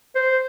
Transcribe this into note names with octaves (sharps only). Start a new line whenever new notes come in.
C5